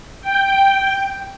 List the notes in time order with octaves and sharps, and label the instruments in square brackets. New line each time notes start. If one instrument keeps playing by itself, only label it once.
[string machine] G5